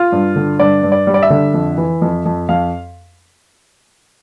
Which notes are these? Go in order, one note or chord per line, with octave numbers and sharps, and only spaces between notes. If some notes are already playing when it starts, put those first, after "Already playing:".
Already playing: F4
G2
D3
G2 D5
G2
D5
G3
D5
E5
D3
F2
E3
F2
F2
F2 F5